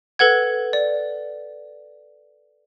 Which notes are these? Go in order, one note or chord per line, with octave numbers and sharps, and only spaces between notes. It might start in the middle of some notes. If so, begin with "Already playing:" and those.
A4 B4 F#5 G#6
D5